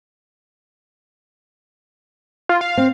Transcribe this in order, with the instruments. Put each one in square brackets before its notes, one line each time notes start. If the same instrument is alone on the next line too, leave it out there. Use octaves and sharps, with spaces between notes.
[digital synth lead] F4
F5
[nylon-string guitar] C4